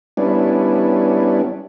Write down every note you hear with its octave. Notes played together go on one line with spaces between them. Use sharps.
G3 B3 C#4 D4 E4